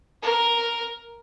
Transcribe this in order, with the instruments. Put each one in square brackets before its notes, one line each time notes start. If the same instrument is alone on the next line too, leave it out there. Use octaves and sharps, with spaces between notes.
[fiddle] A#4